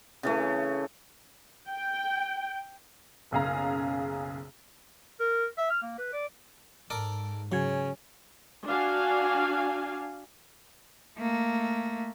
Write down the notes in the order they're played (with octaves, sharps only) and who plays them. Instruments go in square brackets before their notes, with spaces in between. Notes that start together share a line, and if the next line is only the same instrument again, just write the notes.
[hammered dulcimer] C#3 E3 A3
[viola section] G5
[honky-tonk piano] F#1 B1 C#3 G#4 F5 A#5
[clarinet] A#4
E5
F6
A#3
B4
D5
[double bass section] G#2 [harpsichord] A4 A#4 D5
[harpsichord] C#3 [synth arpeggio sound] F#3 F#4 G#6 [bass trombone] C#4
[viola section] D4 F#4 F5 G#5
[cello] A3 A#3